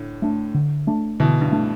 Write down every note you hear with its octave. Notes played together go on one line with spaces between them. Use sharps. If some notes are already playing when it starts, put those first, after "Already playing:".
Already playing: A2 D3
A3 D4
D3
A3 D4
B2 D3 E3
G2 B2
A3 D4